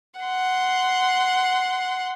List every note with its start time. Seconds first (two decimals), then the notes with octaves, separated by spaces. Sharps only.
0.21 F#5 C6